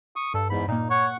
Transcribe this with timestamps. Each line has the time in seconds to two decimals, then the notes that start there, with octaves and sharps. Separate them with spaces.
0.16 C#6 D#6
0.34 G2 A4
0.50 E2 G#2 B5
0.68 A#2 A#3 D#4
0.90 C#5 F#5 C#6